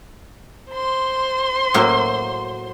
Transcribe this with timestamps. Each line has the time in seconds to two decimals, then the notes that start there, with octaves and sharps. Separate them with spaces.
0.70 C5 C6
1.74 A2 F#3 A#3